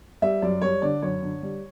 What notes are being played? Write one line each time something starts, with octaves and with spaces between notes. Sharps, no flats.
G3 E5
F#2 D5
G3 C#5
D3 D5
F#2 C#5
D3
G3